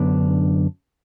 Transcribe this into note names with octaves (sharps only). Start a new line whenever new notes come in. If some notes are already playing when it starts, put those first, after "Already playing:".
Already playing: F#2 D3 B3 D4